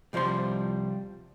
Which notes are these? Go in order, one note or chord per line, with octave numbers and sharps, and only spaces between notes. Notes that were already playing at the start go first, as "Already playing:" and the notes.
C2 F3 G3 C5 C6